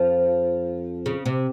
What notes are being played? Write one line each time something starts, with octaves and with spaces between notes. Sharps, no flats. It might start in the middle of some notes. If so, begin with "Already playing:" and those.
Already playing: F2 F3
C#3
C3